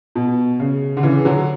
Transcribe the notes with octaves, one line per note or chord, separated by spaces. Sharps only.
B2
C#3
D3
C#3 E3
D3 F#3